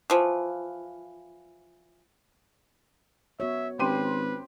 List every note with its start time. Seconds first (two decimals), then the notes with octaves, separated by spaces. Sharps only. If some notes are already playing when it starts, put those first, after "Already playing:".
0.10 E3 F3
3.40 B3 F#4 C#5 E5
3.79 G#1 C#4 G4 B4 C5 C6 D#7